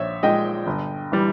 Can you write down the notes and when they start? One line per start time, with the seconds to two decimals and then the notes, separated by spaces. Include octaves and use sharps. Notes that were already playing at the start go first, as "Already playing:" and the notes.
Already playing: A#1 C#5 E5
0.23 A#2 G#3 D#5 G5
0.67 G1
1.12 E3 G3